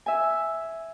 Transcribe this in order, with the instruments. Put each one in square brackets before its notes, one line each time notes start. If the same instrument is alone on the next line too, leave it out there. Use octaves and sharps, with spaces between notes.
[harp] E5 G#5